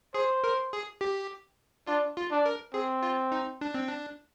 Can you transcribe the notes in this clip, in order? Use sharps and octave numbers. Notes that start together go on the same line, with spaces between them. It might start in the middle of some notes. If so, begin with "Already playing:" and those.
G#4 C5
A#4
G#4
G4
D4 F4
F4
D4
A#4
C4 G#4
F4
D#4
D4
C4
D4